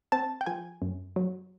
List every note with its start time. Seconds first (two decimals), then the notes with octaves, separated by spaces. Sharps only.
0.12 C4 A5
0.41 G5
0.46 F3 G#5
0.82 F#2
1.16 F#3